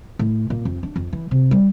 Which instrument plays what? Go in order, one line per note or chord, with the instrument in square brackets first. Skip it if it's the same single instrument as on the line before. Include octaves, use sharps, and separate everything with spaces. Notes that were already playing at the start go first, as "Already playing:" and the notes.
[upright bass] A2
A#2
F2
D4
F2
E3
C3
G3